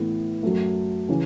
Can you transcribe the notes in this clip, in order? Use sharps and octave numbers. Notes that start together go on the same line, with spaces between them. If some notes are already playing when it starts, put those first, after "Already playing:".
Already playing: A2 E3 B3 E4
F#2 F#3 A3
C#3 E3 C#4